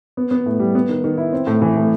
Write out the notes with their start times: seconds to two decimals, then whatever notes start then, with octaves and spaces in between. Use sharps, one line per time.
0.17 B3
0.31 B3
0.46 A2
0.60 G3
0.75 B3
0.89 D#3
1.04 D#3
1.17 E4
1.33 C4
1.47 A2
1.62 E3
1.77 A2